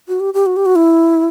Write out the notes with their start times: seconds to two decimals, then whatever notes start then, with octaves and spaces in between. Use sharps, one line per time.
0.08 F#4
0.20 G4
0.34 G4
0.46 F#4
0.56 G4
0.66 F#4
0.76 E4